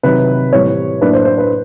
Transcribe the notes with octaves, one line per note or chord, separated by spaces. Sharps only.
C3 D#3 F#3 B4
A2 E3 G3 C4 C#5
A2 F#3 A#3 D4 B4
C5
C5
B4